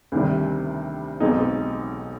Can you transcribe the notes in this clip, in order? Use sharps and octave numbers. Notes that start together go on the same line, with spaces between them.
D2 C3 D#3 G3
B1 B2 G#3 C4 D#4